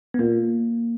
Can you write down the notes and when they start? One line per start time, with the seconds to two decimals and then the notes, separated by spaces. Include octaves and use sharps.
0.14 B3
0.19 A#2 A#3